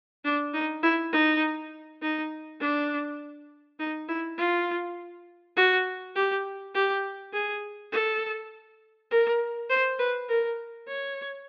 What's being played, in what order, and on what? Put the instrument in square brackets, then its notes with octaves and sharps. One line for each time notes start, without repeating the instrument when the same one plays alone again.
[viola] D4
D#4
E4
D#4
D#4
D4
D#4
E4
F4
F#4
G4
G4
G#4
A4
A#4
C5
B4
A#4
C#5